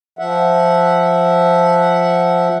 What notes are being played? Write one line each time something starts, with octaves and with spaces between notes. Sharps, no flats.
F3 E5 F#5